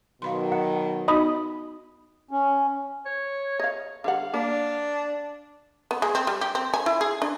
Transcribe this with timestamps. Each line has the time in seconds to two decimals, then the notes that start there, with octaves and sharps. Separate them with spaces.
0.22 B2 D#3 F#3 F5 B5 C6
0.52 F#5
1.08 B3 D#4 F#4 D#5 B5 D#6
2.31 C#4
3.06 C#5
3.59 D#5 F5
4.04 D3 G3 F5 F#5
4.34 A#3 D4
5.91 B3
6.02 G#3
6.15 C4
6.27 G3
6.41 G4
6.55 C4
6.74 G#5
6.86 E4
7.01 G#4
7.22 D4